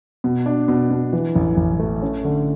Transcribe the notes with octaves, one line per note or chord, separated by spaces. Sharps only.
B2
D4
B2
B2
E3
A1
A1
A3
C#4
D3